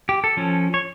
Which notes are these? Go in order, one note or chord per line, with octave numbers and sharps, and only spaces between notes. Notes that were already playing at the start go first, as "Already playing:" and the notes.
G4
A4
F3 C#4
C#5